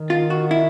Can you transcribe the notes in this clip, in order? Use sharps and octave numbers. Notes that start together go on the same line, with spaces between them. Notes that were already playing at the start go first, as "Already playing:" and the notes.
Already playing: D#3
F4
F#4
E4